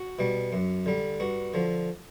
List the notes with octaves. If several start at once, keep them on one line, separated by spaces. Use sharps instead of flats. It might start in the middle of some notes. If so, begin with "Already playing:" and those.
Already playing: F#4
B2 G3
F#2
D3 G3
G2 F#4
D3 F3